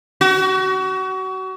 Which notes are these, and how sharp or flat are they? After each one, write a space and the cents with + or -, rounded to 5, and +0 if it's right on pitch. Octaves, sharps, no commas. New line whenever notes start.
F#4 +30